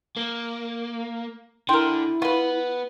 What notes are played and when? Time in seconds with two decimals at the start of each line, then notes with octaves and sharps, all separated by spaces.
0.17 A#3
1.69 D3 E4 A#4 G5 C6
2.22 B3 F4 B4